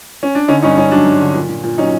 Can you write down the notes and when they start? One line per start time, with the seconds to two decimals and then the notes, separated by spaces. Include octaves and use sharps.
0.23 C#4
0.35 D4
0.48 D3 C#4 D#4
0.62 G2 C#4 D#4
0.77 G2 C#4 D#4
0.91 F#3 D4
1.07 G2
1.21 D3
1.35 A#2
1.49 A#2
1.64 A#2
1.78 F#3 C#4 D#4